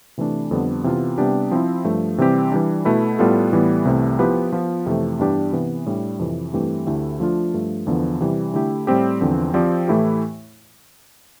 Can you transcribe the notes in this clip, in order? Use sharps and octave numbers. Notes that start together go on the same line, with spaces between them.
C3 E3 A3 D4
F2 D3 G3 B3
C3 E3 B3 F4
C3 G3 B3 D4 G4
F3 C4 E4
G2 F3 A3
C3 E3 G3 C4 G4
E3 G3 D4
B2 A3 E4 B4
A2 G3 B3 F4 A4
A2 E3 G3 B3
C2 C3 E3 A3
F3 B3 E4 G4 B4
F3 B3 F4
F2 C3 E3 A3
G2 E3 B3 D4 G4
C3 E3 B3
A2 G3 D4
F2 C3 E3
G2 E3 A3 C4 G4
D2 D3 A3 E4 G4
F3 A3 D4 F4
G2 F3 A3
E2 D3 F3 B3 E4
C3 E3 G3
D3 A3 E4 G4
A2 G3 C4 G4
E2 D3 F3 C4
F3 C4 G4 D5
A2 E3 A3 E4 G4